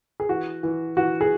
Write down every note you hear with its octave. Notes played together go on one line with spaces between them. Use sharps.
G#4
E3 F#4
E3
E3 F#4
G#4